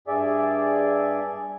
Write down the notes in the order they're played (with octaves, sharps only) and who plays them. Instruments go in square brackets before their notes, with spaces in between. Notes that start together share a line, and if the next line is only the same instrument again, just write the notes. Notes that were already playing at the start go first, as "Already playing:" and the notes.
[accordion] G2 G#4 D5 E5